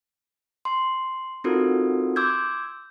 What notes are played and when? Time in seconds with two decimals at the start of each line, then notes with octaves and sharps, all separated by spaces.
0.65 C6
1.44 C4 D#4 F4 F#4 A4 A#4
2.16 C6 D6 E6 G6 G#6